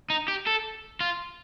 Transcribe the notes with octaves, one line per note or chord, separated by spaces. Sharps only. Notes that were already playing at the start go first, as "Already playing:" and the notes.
D#4
G4
A4
F4